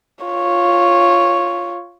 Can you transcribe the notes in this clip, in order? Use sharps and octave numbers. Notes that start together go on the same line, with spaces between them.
F4 C#5